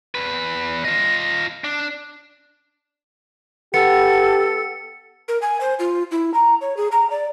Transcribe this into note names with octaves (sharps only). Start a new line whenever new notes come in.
E2 B4
F4 D#5
D4
B3 G4 A4 C#7
A#4
G#5
C5
F4
E4
A#5
C#5
G#4
A#5
D5